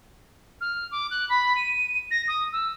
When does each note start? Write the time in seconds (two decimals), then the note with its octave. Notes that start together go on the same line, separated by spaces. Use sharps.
0.61 F6
0.91 D6
1.11 F#6
1.29 B5
1.56 D#7
2.11 A#6
2.28 D#6
2.52 E6